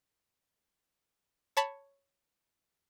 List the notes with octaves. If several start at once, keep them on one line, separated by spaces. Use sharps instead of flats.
C#5 A5 B5